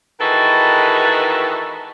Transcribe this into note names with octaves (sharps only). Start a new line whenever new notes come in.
D#3 E3 G#3 F#4 A4 B4